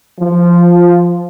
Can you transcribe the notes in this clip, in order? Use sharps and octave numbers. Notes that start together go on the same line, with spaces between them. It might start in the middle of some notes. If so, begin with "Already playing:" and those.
F3